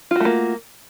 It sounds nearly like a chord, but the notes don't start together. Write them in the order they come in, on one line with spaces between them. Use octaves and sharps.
F4 F#4 A3 A#3